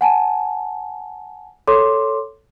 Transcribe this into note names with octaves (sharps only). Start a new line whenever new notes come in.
F#5 G#5 A5
A4 C#5 C6 D6